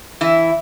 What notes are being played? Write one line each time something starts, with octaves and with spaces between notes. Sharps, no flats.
E3 E4